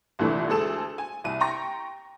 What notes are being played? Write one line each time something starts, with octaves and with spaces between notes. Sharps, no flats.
C2 A#2 D3 E3 A3
D2 G#3 G#4 A4 E7
G#5
C2 D#7
G5 A#5 C6 C#6 A#6